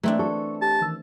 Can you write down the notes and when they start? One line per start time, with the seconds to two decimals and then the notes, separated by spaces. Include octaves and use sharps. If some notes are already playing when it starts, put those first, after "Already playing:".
0.03 E3 A3 C4 D4 D#5 E5 A#5
0.19 A4 C#6
0.62 G4 A5
0.81 D#3 E3 E6